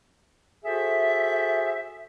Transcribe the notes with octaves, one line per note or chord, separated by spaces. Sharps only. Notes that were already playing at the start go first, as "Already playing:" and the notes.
F#4 G#4 A4 C5 E5